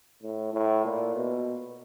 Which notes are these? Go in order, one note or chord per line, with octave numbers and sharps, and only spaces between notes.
A2
A2
A#2
B2